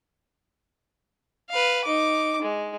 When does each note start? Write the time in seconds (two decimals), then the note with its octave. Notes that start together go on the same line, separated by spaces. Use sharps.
1.50 B4 F5
1.84 D#4 D6
2.42 G#3